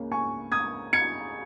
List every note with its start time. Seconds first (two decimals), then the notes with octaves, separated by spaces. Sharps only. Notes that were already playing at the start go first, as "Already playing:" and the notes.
Already playing: C#2 C#3 A#3 C#4
0.12 G#5 C#6
0.52 D#6 G#6
0.93 G#6 C#7